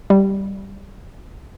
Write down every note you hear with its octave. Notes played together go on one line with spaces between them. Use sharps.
G3